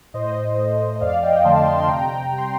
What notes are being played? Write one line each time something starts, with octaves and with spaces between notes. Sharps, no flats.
A2 C5 D#5
A3
D#5
F2 D5 F5
D#5 G5
D3 F3 A3 A5 C6
A5 C6
C6
C3 G5 A#5
G3
C6